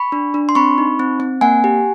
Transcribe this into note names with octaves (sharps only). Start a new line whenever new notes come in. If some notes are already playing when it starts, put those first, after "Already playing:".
Already playing: B5 C#6
D4
D4
C6
C4 B5 C#6
D#4
C4
C4
A#3 F#5 G#5
G4